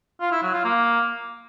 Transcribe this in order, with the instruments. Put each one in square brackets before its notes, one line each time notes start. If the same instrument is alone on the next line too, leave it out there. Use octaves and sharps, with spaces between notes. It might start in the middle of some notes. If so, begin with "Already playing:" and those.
[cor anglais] F4
E4
F#3
F4
A#3